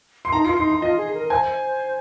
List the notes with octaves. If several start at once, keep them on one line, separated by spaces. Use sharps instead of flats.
C6
D#4 A#5
F4 C6
D#4 C6
C6
F4 D#5
G#4
A#4
A#4
C5 G#5